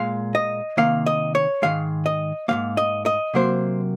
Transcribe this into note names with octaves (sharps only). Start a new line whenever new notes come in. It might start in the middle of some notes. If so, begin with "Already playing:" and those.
Already playing: A#2 G#3 F5
D#5
C3 D#3 A#3 F5
D#5
C#5
G#2 D#3 G#3 F5
D#5
G#2 D#3 A#3 F5
D#5
D#5
C3 F#3 A#3 C5